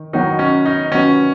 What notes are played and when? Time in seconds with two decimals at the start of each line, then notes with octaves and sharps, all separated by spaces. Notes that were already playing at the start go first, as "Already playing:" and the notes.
Already playing: D#3
0.13 D#3 F#3 B3 D#4 F#4 B4
0.39 C#4
0.66 D#4
0.92 D#3 F#3 B3 C#4 F#4 B4